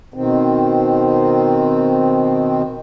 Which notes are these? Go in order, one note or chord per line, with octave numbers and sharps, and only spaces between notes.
B2 D#3 C4